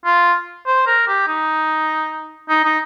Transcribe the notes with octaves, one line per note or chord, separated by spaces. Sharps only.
F4
C5
A#4
G4
D#4
D#4
D#4